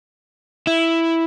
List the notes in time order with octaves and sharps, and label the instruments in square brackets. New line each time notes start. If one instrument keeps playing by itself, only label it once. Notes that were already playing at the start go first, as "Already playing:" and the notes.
[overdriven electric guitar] E4